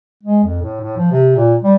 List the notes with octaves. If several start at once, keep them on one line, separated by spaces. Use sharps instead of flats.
G#3
F2
A2
A2
F3
C3
A#2
G3